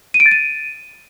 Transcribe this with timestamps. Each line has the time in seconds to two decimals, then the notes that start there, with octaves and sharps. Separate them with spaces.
0.14 D#7
0.20 D7
0.26 A6
0.31 D#7